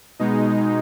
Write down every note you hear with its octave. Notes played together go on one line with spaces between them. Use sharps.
B2 G#3 D#4